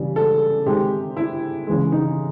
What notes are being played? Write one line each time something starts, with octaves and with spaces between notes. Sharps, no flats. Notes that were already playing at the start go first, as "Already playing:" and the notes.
Already playing: C#3 E3 G3
A4
C3 D#3 G#3 G4
E4
C#3 E3 G#3
D#4